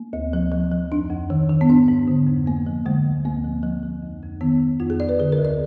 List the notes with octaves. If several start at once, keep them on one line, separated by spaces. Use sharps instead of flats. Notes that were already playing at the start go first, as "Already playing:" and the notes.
Already playing: A#3
D2
F3
F3
F3
F2 D4
F2
D#3
D#3
B3
G#2 D4
G#2
D3
F2
F2 A#3
F3
D3 G#3
D2
D2 A#3
F3
F3
F3
F2
F2
D#3 B3
D#3
F2 F4
G#4
F2 D5
B4
D3 G#4
A#4
D2
D5